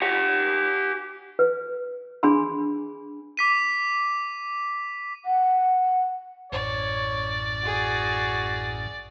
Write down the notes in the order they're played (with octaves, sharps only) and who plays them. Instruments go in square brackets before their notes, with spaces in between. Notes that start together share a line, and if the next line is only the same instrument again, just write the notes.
[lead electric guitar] G4 F#5
[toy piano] B4
D4 G#4 G#5 B5 C6
[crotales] D6 B6 D#7
[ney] F#5
[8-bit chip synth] A1 F#2 A2 [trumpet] C#5 [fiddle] D5
[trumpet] F#4 [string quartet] G#4